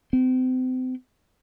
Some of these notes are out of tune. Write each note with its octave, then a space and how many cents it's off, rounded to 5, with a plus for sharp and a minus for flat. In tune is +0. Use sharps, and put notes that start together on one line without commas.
C4 -35